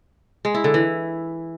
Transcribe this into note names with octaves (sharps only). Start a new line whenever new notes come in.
G#3
E4
D3
E3